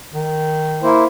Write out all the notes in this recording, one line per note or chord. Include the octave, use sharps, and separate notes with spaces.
D#3
A#3 E4 C5